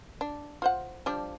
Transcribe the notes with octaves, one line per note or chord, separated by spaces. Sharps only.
D4
F4 C5 F#5
F3 G3 D4